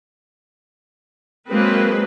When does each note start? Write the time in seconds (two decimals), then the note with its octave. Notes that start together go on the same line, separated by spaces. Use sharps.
1.49 F#3 G#3 A#3 C4 B4